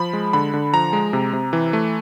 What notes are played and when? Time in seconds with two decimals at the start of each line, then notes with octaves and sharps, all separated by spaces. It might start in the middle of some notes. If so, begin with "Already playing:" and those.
Already playing: F3 B5
0.13 G#3
0.33 D3 B5
0.53 D3
0.73 F3 A#5
0.93 G#3
1.13 C3
1.33 C3
1.53 E3
1.73 A3